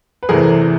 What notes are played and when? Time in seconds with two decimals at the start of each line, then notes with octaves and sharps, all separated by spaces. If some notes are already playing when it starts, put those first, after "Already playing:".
0.23 B4
0.29 E2 C3 E3 A3 G#4 A#4